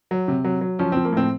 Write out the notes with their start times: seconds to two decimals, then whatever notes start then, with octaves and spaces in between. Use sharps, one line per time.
0.11 F#3
0.28 C3
0.44 F#3
0.61 F#3
0.79 F3 C#4
0.92 F3 C4
1.05 A#3
1.13 A2 C4